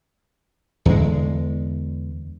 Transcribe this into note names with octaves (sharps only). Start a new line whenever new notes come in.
E2 D3 G#3